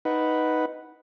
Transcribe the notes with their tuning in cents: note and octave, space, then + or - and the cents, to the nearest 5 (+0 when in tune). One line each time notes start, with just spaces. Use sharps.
D#4 +0 B4 +0 F#5 +0